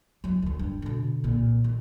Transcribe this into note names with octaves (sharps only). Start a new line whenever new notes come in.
F#3 E4
D2 D#3
G2
B2 D3
C2 A#2
D#3